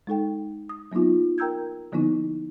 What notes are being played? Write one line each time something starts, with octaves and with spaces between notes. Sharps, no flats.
G#3 D#4 A4 G5
D#6
F#3 A#3 B3 D#4 F4
A#4 G5 A#5 E6 G6 G#6
D3 F3 A#3 B3 D#4 E4